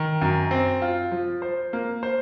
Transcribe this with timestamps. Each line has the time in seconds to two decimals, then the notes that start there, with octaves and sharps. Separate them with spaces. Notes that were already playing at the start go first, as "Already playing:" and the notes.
Already playing: D#3
0.21 F#2
0.51 C4
0.82 F4
1.12 F3
1.42 C5
1.73 A#3
2.03 C5